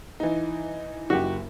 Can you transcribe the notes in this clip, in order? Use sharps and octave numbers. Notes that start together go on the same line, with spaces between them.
E3 D#4
F#1 F#2 F#4 G4